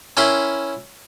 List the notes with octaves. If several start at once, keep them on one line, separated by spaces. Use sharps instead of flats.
C#4 E4 A#4 G5 B5 C6